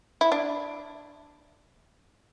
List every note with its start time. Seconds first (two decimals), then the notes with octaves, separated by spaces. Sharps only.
0.21 E4
0.32 D4